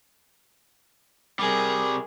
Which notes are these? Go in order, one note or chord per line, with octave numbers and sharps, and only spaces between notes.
C3 G3 G#4 A#4